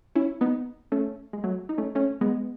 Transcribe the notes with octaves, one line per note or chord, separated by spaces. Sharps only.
C#4 E4
B3 D#4
A3 C#4
G#3
F#3 A3
D#4
A3 C#4
A3 C#4
G#3 B3